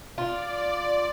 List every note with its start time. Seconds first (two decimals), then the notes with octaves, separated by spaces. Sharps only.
0.18 F4 D5